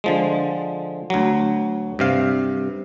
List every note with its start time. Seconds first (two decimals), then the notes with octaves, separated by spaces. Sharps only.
0.04 D3 F3 G#3
1.10 D2 F#3
1.99 G2 C3 F5